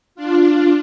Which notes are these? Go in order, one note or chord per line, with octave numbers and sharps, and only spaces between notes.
D4 F4